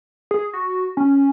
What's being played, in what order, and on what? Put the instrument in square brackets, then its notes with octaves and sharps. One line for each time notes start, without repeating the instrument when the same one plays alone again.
[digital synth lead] G#4
F#4
C#4